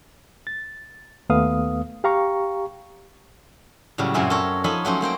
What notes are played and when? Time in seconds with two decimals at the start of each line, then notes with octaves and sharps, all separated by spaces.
0.47 A6
1.29 D#2 A3 B3 F5 D#6
2.04 G4 F5 A#5 C#6
3.98 A2 C#3 F#3 G3
4.14 F#2 A#2 C4 G#4 E5 G#5
4.30 A4 A#4 C#5
4.64 F3 D#4 A4 C#5 G#5 B5
4.85 F#3 A3 C#4 C5
5.01 A3 A#3 C5 G5